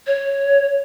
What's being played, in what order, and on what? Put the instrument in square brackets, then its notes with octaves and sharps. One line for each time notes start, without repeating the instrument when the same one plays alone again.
[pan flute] C#5